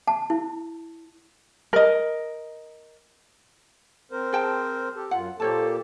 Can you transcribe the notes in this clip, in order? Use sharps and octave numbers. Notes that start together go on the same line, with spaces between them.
A5
E4
A#4 D#5
C4 A#4 C5
G#4 G5 A5
G4 A4
F#2 F4 F#5
A#2 A#3 G4 A4 C5 C#5 A5